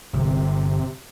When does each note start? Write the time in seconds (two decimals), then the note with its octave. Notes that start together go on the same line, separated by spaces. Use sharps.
0.13 G1 C3